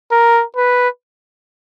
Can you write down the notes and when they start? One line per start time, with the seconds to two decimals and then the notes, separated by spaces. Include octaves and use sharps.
0.11 A#4
0.56 B4